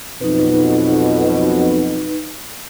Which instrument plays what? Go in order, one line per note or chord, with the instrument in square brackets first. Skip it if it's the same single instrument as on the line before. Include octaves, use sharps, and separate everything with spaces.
[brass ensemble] B1 F2 B2 [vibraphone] D#4 B4